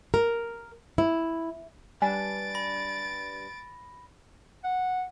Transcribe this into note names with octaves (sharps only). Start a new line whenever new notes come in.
A#4
E4
G3 D4 B4 G#5 A6 D7
B5 A#6
F#5